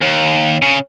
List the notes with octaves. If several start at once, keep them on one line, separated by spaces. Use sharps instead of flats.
D#2
C#3